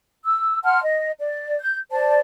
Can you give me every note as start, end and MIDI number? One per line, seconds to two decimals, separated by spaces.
0.24 0.59 88
0.64 0.79 78
0.64 0.79 81
0.64 0.79 84
0.64 0.79 89
0.82 1.11 75
1.19 1.57 74
1.60 1.78 91
1.90 2.18 72
1.90 2.18 74
1.90 2.18 81